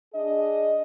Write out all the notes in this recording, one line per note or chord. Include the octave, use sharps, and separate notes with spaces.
D4 G#4 D#5